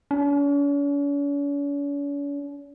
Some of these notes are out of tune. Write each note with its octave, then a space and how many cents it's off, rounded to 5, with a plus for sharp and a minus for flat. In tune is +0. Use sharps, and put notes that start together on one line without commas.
C#4 +45